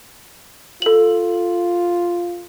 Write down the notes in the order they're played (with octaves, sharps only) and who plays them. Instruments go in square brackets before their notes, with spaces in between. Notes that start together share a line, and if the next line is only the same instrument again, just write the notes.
[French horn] F4 [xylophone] A4 F#7